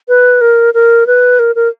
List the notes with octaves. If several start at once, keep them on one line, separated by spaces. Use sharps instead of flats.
B4
A#4
A#4
B4
A#4
A#4